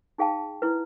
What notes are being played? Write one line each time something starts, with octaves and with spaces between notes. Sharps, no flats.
D#4 G#4 F5 G5 A5
E4 B4